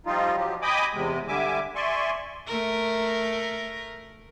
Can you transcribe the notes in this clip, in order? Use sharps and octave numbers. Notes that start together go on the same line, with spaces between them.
F3 G3 D#4 F4
F3 F#3 G4
D#5 G5 G#5 B5 D6 D#6
E2 C3 G#3
D3 G3 E5 G#5 D6
D5 E5 G#5 C6 C#6
A3 A#4